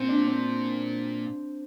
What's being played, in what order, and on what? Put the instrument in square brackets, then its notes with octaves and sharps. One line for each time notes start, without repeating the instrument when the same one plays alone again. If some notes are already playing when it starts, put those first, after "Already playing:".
Already playing: [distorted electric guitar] A#2 [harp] C4
[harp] D4
C4